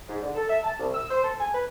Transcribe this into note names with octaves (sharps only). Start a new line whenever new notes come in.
G#2
D3
A4
E5
A5
C2
E6
C5
A4
G#5
B4